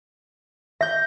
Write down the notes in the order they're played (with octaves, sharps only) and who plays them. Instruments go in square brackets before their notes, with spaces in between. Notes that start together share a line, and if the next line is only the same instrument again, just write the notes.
[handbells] E5 [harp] G6 A#6